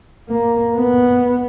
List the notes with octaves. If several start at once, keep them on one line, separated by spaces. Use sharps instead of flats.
A#3
B3